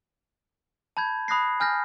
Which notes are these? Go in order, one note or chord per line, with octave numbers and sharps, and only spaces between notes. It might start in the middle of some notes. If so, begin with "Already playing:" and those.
A5 B5 G6 G#6
A5 B5 D#6 F#6 A#6 C7
G#5 F6 G6 A#6